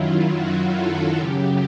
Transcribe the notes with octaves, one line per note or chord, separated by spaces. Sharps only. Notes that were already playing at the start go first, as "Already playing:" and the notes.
Already playing: F#2 D#3 F#3 E4 F4
F#4
A4
F#2 C#3 F#3 G4